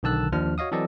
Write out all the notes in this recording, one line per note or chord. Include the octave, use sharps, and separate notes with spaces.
B1 D3 D#3 A5 E6 F#6
D#2 F3 D4 F6
F#4 C#5 D#5 F5 D#6
E3 F#3 C4 A4 D5 D#5